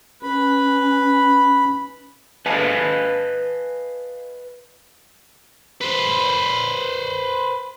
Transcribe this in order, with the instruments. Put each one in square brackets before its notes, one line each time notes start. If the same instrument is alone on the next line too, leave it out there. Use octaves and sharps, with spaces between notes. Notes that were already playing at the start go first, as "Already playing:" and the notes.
[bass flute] C#4 [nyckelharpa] B4 [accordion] B5
[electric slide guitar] B4 D#5 F5 G#5 A5
[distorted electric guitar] B4 C5